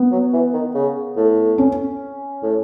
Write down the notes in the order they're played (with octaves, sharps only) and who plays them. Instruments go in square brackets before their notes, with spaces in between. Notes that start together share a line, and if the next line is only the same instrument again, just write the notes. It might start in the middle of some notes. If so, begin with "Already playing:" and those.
Already playing: [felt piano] B3
[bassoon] F#3
E3
D#3
C#3
A2
[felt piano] C#4
[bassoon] A2